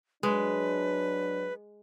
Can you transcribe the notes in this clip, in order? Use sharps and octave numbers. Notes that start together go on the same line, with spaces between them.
F#3 G#3 D4 B4